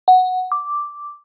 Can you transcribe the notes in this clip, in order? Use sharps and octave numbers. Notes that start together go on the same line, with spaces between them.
F#5
D6